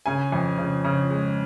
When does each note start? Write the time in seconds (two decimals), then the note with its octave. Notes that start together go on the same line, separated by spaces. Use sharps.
0.06 C#3 G#5
0.32 F2
0.58 C#3
0.84 C#3
1.10 G#3